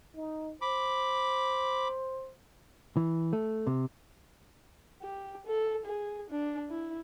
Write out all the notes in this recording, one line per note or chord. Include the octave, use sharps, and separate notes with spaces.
D#4
C5 B5 D6
E3
A3
C3
G4
A4
G#4
D4
E4